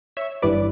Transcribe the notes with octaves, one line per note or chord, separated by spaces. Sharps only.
C#5 E5
G1 G2 E3 G3 B4 D5